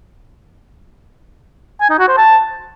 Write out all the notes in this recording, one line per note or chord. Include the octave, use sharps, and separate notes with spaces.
G#5
D#4
F#4
C5
A5